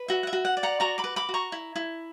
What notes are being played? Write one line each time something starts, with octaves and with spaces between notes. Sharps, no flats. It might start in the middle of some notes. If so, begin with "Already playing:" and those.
Already playing: B4
F#4 E5
F#5
E5
F#4
F#5
D5
F#5 A#5
F#4 A#5 C#6
B5 D6
B4
B5 D6
F#4
A#5 C#6
E4
E4